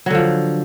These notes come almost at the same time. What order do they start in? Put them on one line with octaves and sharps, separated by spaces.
F#3 D3 F3